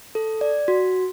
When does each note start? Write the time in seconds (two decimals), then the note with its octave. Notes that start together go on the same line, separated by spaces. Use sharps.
0.15 A4
0.41 D5
0.68 F#4